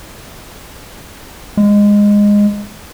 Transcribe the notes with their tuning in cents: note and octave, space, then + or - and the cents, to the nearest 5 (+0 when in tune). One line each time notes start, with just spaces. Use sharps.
G#3 -15